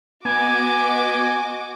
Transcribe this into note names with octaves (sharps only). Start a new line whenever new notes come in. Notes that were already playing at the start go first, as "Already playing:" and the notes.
B3 F#4 D#5 G#5 D6